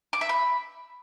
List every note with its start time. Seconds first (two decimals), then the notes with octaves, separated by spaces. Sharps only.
0.13 D6
0.21 E5
0.29 B5